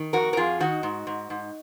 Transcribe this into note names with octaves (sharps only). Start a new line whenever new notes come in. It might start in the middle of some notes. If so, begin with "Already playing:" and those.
Already playing: D#3
F2 F#4 A#4
A#4
F2 F4 G#4
D#3 D#4 F#4
G#2
G#2
G#2